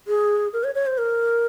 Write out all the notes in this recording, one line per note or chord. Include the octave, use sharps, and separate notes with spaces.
G#4
A#4
C#5
C#5
C5
A#4